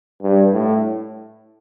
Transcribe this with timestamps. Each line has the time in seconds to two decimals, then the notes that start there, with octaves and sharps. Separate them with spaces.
0.22 G2
0.53 A2